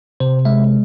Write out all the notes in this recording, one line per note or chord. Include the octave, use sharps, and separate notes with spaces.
C3 C5
G#3 E5